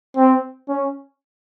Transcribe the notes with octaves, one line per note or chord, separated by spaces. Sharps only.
C4
C#4